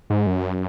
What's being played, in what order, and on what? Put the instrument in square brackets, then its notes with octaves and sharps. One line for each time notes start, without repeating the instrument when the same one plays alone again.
[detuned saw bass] G#2
F#2